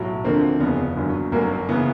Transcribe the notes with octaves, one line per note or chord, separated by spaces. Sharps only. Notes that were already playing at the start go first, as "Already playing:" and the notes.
Already playing: B1 A2 F#3
D2 D3 F3 A#3 C4
F#1 E2 C#3 F3 B3
G1 F#2 D#3 F#3
G1 F#2 D3 F#3 A#3
C#3 E3 B3